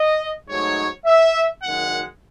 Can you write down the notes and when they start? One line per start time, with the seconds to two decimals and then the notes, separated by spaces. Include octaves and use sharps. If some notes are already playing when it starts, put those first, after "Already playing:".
Already playing: D#5
0.48 G#2 F#3 A3 D#4 C#5
1.05 E5
1.63 F#1 F#2 D#3 G#3 F#5